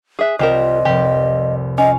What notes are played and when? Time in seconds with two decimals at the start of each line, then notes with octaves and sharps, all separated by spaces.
0.19 G#4 E5 D#6 F#6
0.39 C2 C4 F4 G4 A#4 D#5 E7
0.85 F1 C2 G4
1.78 C#4 F4 D#5